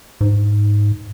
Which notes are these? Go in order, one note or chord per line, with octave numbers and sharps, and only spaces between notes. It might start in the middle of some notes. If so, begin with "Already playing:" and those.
G#2